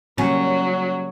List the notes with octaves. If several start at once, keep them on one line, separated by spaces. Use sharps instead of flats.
C#3 F#3 G3 A#3 C#4